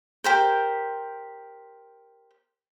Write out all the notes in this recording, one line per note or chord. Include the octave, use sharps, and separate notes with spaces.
G4 A#4 C5